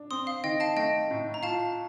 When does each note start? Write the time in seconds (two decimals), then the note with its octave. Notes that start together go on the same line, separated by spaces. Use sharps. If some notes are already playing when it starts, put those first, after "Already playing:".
Already playing: D4
0.11 C4 C6 D#6
0.27 F5
0.43 D#3 D#5 G5
0.60 F5 A5
0.76 A3 D#5 G5
1.11 A2
1.34 A#5
1.43 F4 F5 A5